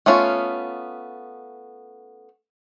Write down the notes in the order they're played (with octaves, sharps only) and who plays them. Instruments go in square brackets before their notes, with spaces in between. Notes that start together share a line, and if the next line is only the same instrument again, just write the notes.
[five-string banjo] A3 B3 C#4 F4